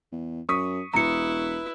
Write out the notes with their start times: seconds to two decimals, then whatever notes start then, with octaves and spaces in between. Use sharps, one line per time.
0.12 E2
0.49 F#2 C#6 D#6 B6
0.94 E1 E4 B4 A#5 C#7